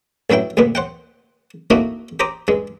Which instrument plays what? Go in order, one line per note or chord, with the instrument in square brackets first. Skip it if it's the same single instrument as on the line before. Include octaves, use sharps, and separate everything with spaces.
[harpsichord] A1 G2 F#3 E4 G5
D2 G2 A#2 B3
C5 F#5 G5
A3 A#3 C4 D#4 E4 F#4
G4 C5 A#5 D6 D#6
G2 G#3